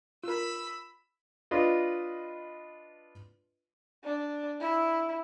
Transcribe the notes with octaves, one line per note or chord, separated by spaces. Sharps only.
F4 A#4 B5 E6
D4 F4 B4 D#5
D4
E4